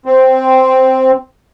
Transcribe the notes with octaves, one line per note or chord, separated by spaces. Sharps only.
C4